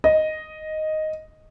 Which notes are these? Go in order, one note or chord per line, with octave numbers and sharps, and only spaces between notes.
D#5